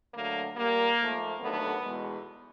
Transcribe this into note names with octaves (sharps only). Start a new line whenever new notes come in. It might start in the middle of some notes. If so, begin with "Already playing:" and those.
D2 D3 F#3 A3 A#3
A#2 G3 A#3
G#2 F3 A3
D#2 D3 F#3 A3 B3
E2 B2 G#3